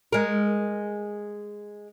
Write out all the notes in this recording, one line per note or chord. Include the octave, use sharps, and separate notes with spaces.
G#3 A#4